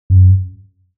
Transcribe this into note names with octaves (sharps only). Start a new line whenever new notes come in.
F#2